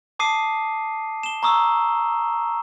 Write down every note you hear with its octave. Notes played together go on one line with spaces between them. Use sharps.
A5 D6 D#6 C7 D#7
E7 G7
A#5 C#6 D#6 E6